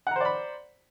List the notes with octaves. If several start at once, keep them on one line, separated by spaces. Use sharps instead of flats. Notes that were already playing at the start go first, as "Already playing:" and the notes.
C5 D5 F#5 A#5 B5